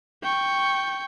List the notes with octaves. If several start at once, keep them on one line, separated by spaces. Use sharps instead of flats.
G5 C#6